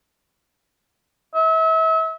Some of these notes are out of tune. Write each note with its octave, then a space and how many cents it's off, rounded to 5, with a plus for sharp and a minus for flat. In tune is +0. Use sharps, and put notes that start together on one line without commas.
E5 -35